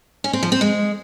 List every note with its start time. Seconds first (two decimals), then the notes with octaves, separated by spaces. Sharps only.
0.24 C#4
0.33 C4
0.43 F3
0.52 C4
0.61 G#3